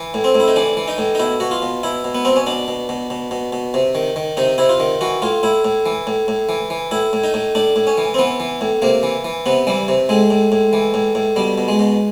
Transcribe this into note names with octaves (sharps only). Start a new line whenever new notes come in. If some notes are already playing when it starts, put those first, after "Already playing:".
Already playing: E3
A2
C4
A2
E4
D#4
E3 D4
E3
D#4
A2
D#4
B2 E4
B2 F#4
F4
B2
B2 E4
B2
B3
B2 C4
C#4
B2 D4
B2
B2
B2
B2
B2
C3
D#3
D#3
C3 D#4
C3 E4
F4
D#3
E3 F#4
A2 F4
A2 E4
A2
E3
A2
A2
E3
E3
A2 E4
A2
D#4
A2
A2 D4
A2
C#4
E3
C4
E3 B3
E3
A2
C3 A#3
E3
E3
C3 B3
E3 G3
C3
A2 G#3
A2
A2
E3
A2
A2
B2 G3
B2
G#3
B2